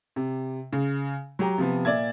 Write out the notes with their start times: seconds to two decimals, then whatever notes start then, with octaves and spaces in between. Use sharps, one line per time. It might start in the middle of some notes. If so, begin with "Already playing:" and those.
0.16 C3
0.73 C#3
1.39 F#3 G4 A#5
1.58 C3 F3 B3
1.85 A#2 D5 E5 G#6